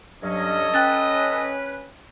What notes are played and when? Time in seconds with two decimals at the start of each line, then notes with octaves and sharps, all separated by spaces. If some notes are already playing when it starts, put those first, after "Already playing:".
0.23 G2 F#3 C#4 A4 D#5
0.74 C#4 B4 G5 F#6 A6